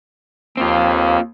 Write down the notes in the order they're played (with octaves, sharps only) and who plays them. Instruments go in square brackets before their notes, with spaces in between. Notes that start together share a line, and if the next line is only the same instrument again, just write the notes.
[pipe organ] D#2 [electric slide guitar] C4 F4